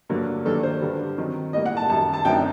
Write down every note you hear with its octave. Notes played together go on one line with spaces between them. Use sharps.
G2 D3 F#3 A#3
G2 D#3 F#3 A#3 D4 A4
C5
G2 D3 G3
D#3 F#3 C4 D#4
A2 G3 A#3 D#5
F#5
A5
F#2 D#3 G3 A5
A5
F#2 D3 A3 C4 D#4 G5